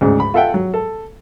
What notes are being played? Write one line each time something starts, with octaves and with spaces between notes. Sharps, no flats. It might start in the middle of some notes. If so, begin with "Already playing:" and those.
D2 G#2 C#3
B5
F4 A4 E5 F#5 G5
F#3
A4